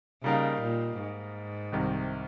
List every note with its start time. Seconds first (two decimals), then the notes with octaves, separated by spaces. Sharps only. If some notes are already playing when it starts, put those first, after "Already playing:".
0.23 C#3 G3 A#3 D#4 A#4 F5
0.61 A#2
0.99 G#2
1.72 C2 C3 D#3